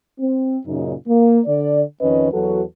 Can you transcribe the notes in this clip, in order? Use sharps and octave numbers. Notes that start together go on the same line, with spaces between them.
C4
F#2 A#2 C#3 D#4
A#3
D3 D5
F2 D#3 C#4 B4 D#5
E2 F#3 F#4 A4 B4